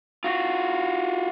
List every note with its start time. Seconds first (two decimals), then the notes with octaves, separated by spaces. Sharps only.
0.24 F4 F#4